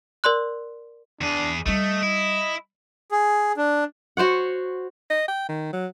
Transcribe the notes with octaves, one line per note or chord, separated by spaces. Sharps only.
A#4 D5 C6 F#6
E2 D4 G#4
G3 A3 D#4 D#5
E4
G#4
D4
F#4 C5 C#5 F#5
D#5
G5
D#3
F#3